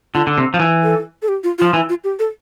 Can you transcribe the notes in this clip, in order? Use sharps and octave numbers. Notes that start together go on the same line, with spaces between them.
D3 F4
D3
C3
F3
E3
A4
A4
G4
F4
F4
F3
E3 E4
F4
G4
A4